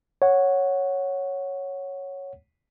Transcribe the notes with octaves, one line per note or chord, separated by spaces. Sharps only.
C#5 F#5